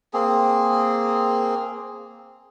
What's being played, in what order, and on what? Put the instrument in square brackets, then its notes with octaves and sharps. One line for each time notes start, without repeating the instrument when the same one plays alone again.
[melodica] A#3 C4 G#4